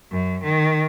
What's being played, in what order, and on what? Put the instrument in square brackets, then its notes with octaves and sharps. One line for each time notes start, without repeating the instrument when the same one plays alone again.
[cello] F#2
D#3